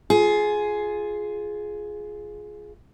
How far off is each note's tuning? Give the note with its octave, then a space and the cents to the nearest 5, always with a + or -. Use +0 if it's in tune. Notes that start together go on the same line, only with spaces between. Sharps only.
F4 +0 G#4 +10